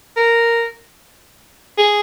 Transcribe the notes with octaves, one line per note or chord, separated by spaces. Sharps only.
A#4
G#4